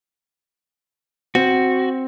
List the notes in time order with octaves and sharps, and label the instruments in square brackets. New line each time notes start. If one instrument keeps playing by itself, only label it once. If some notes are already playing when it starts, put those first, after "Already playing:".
[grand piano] C4 [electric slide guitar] F#4